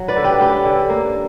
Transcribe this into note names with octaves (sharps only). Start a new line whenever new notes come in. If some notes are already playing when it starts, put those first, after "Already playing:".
Already playing: F#3
B4 D5
D3
G4 B4
C#4 G4 B4
D3
A#3